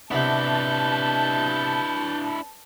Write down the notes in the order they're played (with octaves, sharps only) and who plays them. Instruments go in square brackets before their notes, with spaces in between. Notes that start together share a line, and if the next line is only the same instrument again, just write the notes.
[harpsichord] C3 B3 [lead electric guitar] D4 E4 [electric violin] B4 G6 [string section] A5